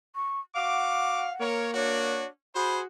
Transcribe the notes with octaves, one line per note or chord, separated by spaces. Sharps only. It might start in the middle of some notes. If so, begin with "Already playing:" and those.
C#6
F#4 F5 F#5 D6
A#3 A#4 C#5
D4 F#4 C#5
F#4 G#4 C5 B5